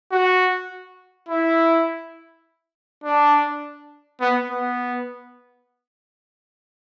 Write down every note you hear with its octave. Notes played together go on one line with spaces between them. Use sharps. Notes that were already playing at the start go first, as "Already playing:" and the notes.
F#4
E4
D4
B3
B3